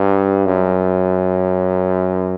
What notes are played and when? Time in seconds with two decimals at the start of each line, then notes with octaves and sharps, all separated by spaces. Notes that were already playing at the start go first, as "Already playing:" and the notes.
Already playing: G2
0.46 F#2